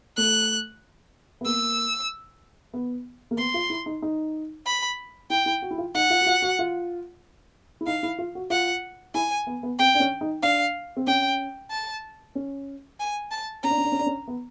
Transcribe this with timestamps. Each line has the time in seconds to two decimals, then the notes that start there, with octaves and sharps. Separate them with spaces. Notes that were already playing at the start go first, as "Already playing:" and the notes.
0.17 A3 F#6
1.41 B3
1.45 A#3 E6
2.73 B3
3.31 A#3
3.38 B3 C6
3.54 F4
3.70 E4
3.86 D#4
4.02 D#4
4.66 B5
5.30 E4 G5
5.46 E4
5.62 F#4
5.71 E4
5.78 F4
5.94 D#4 F#5
6.10 F4
6.21 F#4
6.26 F4
6.42 F#4
6.59 F4
7.81 E4
7.87 D#4 F5
8.03 E4
8.18 F4
8.35 F#4
8.50 F4 F#5
9.14 E4 G#5
9.47 B3
9.63 B3
9.79 C4 G5
9.94 D4
10.00 C#4
10.21 D#4
10.42 D4 F5
10.97 C4
11.07 C#4 G5
11.71 A5
12.35 C#4
13.00 G#5
13.31 A5
13.63 C#4 A#5
13.70 D4
13.78 C#4
13.85 D4
13.92 C#4
13.99 D4
14.06 C#4
14.28 B3